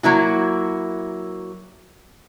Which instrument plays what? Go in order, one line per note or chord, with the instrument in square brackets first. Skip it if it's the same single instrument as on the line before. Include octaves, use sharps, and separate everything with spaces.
[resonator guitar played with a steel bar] F#3 A#3 E4 F#4